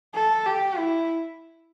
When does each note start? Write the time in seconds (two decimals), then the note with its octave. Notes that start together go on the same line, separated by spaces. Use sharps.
0.15 A4
0.46 G4
0.78 E4